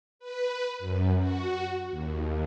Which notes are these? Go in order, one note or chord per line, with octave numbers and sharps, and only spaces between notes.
B4
F#2
F#4
D#2